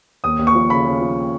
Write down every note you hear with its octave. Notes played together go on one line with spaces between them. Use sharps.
D#2 D#6
D#2
C#6
F3
C#3 B5
C#3
F3